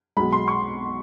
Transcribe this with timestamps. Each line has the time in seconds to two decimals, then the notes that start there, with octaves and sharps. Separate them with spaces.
0.17 B1 B2 G#3 B5
0.32 C6
0.48 C#6